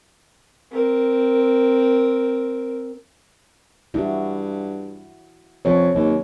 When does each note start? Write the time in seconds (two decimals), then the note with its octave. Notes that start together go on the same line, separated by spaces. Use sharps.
0.71 C4 A#4
3.94 G2 E4 F#4
5.65 F2 C4 C#5
5.95 D#2 F#3